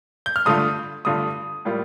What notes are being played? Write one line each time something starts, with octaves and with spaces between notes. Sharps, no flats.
G6
F6
G2 D3 A3 D4 F4 D#6
G2 D3 A3 D4 F4 D#6
A2 G3 A#3 F4